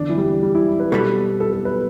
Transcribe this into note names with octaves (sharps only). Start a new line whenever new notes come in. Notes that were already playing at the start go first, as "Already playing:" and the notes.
Already playing: E2 D3 D4
E3
G3
G3
E4
B4
B2 G3 B3 A4
A4
A4
B4